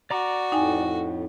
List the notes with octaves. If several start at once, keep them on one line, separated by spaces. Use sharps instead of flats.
F#4 D5 A#5 D6
F2 A2 D#4 G5 G#5